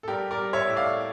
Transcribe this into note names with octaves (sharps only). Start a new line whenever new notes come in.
A4
G3 G4 A#4
A#4 D5
G3
C#5 E5
A2 E5
D5 F5